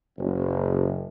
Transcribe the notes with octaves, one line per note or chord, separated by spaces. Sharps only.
F#1